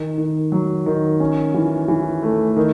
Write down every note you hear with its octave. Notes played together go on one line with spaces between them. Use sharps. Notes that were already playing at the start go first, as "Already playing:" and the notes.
Already playing: D#3
D#3
F#3
D#3
C#4
E3
E3
A3
D#3